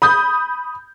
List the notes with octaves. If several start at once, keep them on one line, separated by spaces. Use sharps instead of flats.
B5 D#6 G6